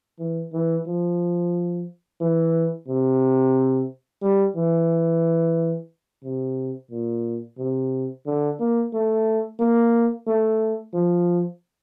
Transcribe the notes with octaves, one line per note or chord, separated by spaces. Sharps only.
E3
E3
F3
E3
C3
G3
E3
C3
A#2
C3
D3
A#3
A3
A#3
A3
F3